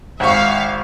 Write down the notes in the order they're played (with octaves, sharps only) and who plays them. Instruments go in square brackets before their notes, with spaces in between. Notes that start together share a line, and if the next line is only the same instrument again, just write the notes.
[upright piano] G#1 C#6 [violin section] E5 F5